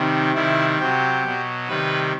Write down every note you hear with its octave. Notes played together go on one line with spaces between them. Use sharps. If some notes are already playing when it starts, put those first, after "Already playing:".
Already playing: C3 D#3 G3
C3 D#3 G3 E4
C3 F#3 G4
B2 F#3
C3 D#3 G3 B4